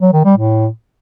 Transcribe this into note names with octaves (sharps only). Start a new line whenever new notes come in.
F#3
D#3
G3
A2